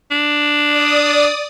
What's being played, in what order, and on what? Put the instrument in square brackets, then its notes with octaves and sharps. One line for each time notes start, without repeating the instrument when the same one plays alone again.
[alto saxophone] D4
[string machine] D5 D#6